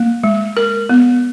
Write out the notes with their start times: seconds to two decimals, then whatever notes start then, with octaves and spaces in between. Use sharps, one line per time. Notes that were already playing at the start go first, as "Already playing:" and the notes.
Already playing: A#3
0.24 G#3
0.57 A#4
0.89 B3